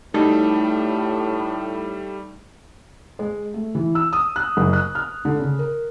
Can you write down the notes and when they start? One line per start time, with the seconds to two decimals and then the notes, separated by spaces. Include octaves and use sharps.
0.14 A2 G3 A3 D#4 F#4 A4
3.19 G#3
3.54 A3
3.75 E3
3.95 E6
4.13 D#6
4.36 F#6
4.57 F#1
4.73 F#6
4.95 F6
5.25 D3
5.40 C#3
5.59 A#4